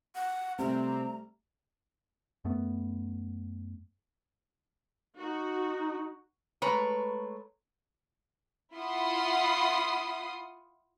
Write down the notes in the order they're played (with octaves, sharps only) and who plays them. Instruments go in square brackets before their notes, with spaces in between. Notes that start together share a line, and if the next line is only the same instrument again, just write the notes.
[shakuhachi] F#5
[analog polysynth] C3 C4 [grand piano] G3 A3 [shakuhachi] A#5
[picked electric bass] F#2 A3 B3
[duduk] D#4 [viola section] F#4
[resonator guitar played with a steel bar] G#3 A3 B4 C#5 A#5
[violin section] E4 F4 F#5 C6 D#6